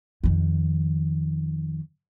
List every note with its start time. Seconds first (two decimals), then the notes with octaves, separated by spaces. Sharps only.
0.23 F2 D#3